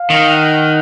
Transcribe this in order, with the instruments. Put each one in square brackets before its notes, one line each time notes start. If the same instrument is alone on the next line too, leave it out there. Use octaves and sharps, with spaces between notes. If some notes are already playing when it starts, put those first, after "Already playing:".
Already playing: [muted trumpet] F5
[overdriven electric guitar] D#3
[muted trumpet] F#5